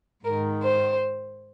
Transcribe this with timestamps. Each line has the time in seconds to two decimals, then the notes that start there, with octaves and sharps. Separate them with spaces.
0.24 G#2 D#3 A#4
0.62 C5